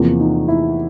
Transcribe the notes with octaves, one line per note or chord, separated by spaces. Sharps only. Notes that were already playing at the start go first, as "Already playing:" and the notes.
Already playing: E2 C3 F3 A#3
D#4
E4